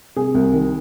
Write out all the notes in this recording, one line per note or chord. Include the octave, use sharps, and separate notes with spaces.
C3 G#4
C2
D#3